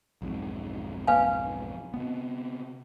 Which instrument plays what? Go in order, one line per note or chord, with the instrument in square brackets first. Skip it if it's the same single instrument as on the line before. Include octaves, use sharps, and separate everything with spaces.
[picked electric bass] B1 F2 G#2
[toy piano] B4 F5 G#5
[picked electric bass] C3 B3